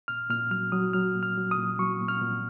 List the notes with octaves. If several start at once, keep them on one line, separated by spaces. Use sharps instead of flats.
A#2 F6
A#2 F6
F#3 F6
F#3 D#6
F#3 F6
A#2
F6
F#3
D#6
A#2
F#3 C#6
A#2
F6
A#2